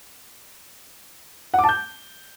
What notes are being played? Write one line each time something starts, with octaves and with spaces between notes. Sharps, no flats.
F#5
D6
A5
G6